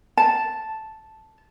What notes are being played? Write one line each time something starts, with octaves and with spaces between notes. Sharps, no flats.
A5